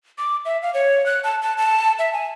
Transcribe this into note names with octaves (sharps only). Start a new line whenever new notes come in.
D6
E5
F5
C#5
F#6
A5
A5
A5
E5
G#5